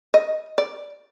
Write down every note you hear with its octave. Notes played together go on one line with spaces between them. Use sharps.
D#5
D5